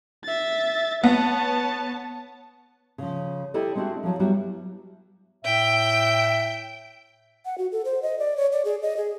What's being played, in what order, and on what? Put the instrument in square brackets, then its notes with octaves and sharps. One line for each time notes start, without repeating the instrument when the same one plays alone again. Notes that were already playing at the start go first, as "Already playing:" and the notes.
[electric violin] E5 A6
[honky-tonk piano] B3 [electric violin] C#5 A5
[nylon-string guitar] C#3 F3
E4 G4 A4 D5 D#5
G#3 C4 D4 E4 F#4 G#4
F3 F#3
F#3 G3 B3 E4 F#4
[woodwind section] A2 E5 [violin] G5
[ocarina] F#5
F#4
A4
C5
D#5
D5
C#5
D5
G#4
D#5
G#4